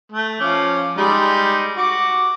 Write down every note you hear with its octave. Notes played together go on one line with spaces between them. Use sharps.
A3
F3 C#4 D6
G3 G#3 D#4
F#4 D6